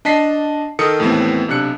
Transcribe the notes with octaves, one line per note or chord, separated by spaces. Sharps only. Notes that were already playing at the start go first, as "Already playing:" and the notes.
D4 D#5 A5 B6 C7
D#3 A4 A#4 D#6 C#7
D#2 A2 E3 B3 C4
B1 C3 D4 F#6 C#7